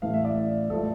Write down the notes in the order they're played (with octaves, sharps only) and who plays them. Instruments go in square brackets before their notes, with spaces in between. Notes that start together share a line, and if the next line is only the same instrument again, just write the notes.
[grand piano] A1 A2 E3 A3 F5
E5
D5
A1 A2 F3 A3 A4